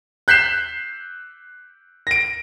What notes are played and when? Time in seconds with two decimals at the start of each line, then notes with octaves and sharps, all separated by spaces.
0.28 F#6 G6 B6 C7 E7
2.07 A#6 D7